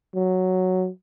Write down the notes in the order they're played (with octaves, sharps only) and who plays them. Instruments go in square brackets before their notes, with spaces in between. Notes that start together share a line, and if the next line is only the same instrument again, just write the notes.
[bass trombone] F#3